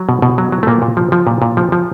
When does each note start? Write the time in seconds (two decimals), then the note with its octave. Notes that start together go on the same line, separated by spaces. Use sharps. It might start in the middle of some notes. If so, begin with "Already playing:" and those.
Already playing: F#3
0.09 B2
0.22 B2
0.38 F#3
0.52 F#3
0.63 A3
0.67 A#2 A#3
0.82 A#2
0.97 F3
1.12 F3
1.27 A#2
1.42 A#2
1.57 F3
1.72 F3